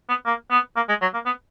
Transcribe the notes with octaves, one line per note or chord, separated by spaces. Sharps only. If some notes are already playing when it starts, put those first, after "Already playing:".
B3
A#3
B3
A#3
G#3
F#3
A#3
B3